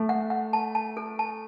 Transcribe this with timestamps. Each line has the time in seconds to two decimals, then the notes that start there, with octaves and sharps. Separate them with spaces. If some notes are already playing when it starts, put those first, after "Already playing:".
Already playing: A3 A4
0.09 F#5
0.30 F#5
0.53 A5
0.75 A5
0.97 A4
1.19 A5